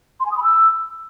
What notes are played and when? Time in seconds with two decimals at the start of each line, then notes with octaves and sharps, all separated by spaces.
0.20 C6
0.26 G#5
0.31 D#6
0.37 B5
0.43 E6